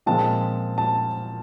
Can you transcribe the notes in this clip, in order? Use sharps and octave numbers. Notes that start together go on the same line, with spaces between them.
A#2 F3 G#3 C4 F4 A5
A5